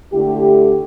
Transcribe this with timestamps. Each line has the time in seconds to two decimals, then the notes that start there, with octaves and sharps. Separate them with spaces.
0.12 D3 A3 E4 G4